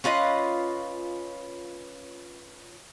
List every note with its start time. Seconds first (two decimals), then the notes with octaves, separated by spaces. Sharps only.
0.04 C#4 F4 B4 D#5